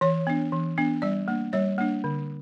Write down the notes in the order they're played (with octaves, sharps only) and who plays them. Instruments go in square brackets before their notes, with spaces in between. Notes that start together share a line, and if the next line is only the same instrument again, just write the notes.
[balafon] E3 C#5
B3 D4
E3
B3 D4
G3 D5
A#3 D4
G3 C#5
A#3 D4
D3